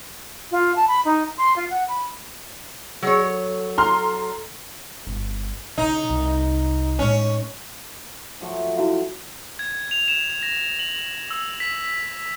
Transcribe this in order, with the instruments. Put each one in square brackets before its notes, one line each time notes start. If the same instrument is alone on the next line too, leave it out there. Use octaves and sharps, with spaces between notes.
[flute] F4
A5
B5
D#4
C6
F4
F#5
B5
[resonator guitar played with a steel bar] F#3 C#5 [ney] G#4
[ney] A4
[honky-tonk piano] A#5 C6 F6
[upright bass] G1
[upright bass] C#3 E4 [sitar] D#4
[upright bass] C2 C3
[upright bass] A2 G#3 [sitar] C#4
[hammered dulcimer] F3 F#3 A3
[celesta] E4 F#4 F5
[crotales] G#6
F7
E7
A#6
F#7
E6
B6